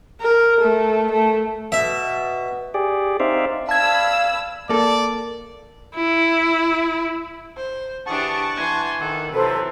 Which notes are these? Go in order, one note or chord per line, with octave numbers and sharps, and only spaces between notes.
A#4
A3
A3
B2 E5
G4 G#4 D5
C4 D#4 C5 D5 E5 F5
D5 F5 A5 B5 E6 G#6
A#3 A4 D5
E4
C5
E3 D4 G4 G#4 F#5 A5 C#6
E3 G#5 C6 G6
D#3 A4 F#5
C3 E3 F#3 A4 B4 C5